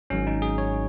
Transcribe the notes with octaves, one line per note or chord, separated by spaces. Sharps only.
G#1 G#2 F#3 C#4
D#4
G#4
C#5